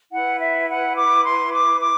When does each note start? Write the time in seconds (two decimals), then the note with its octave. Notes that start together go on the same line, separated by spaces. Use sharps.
0.11 E4 B4 F#5
0.40 E5
0.68 F#5
0.96 D6
1.24 C6
1.52 D6
1.81 D6